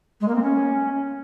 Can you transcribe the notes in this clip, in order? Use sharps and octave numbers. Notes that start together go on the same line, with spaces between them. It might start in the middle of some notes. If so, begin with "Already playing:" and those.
G#3
A#3
C4
C#4